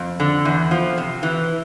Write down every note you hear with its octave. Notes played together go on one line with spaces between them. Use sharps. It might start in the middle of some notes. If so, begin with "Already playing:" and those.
Already playing: F2
D3
E2
F3
C3
E3